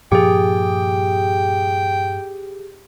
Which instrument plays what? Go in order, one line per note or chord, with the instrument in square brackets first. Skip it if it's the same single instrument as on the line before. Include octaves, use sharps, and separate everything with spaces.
[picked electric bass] G2 A#2 F3 [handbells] G4 G#4 [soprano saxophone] G5